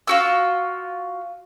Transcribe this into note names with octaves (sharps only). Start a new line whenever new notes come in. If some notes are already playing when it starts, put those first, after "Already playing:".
F4 F#4 E6